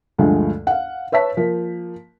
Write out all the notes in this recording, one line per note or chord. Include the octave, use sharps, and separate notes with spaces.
D2 G2 D3 F3 G#3
F5 F#5
B4 C#5 E5 A5 B6
F3 A#3